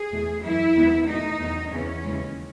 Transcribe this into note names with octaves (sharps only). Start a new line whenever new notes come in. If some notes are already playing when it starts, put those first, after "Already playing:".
Already playing: G#4
E2 B2 A3
F#2 E3 A3 E4
E2 D#3 G#3 B3
B2 A3 D#4
E2 D#3 F#3 B3
E2 C#3 E3 B3 C#4
D#2 C#3 E3 G#3